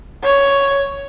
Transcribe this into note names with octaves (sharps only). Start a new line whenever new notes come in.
C#5